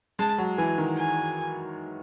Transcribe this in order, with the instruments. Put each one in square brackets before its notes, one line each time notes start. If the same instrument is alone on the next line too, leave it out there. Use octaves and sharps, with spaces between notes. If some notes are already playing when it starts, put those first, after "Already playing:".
[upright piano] G#3 [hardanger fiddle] A5
[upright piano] F#3
[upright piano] E3 [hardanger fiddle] G#5
[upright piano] D#3
[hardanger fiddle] G#5